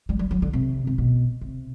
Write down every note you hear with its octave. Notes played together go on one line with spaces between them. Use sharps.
G3
G3
F#3
D3
C3
C3
B2
C3